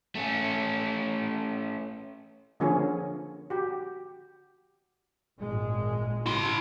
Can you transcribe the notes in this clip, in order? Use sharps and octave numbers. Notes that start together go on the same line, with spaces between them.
A3 C#4
D3 F3 A#3 C#4 G#4 C#5
F#4 G4
G#1 A#2 G#3
C#3 E4 C6